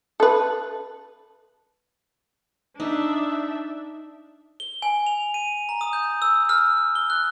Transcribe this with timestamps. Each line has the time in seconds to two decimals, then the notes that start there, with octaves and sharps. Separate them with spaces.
0.20 A4 B4
2.80 D4 D#4 E5
4.60 G7
4.82 G#5
5.07 F7
5.34 D#7
5.69 A#5
5.81 D#6
5.93 G6
6.22 E6
6.49 F6
6.95 G7
7.10 F#6